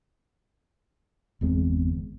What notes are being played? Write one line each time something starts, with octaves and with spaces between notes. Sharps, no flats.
G1 E2 G#3 C4